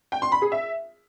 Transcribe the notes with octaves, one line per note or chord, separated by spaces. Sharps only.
G5
C6
B5
G#4
E5